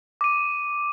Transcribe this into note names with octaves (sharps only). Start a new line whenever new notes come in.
D6 D#7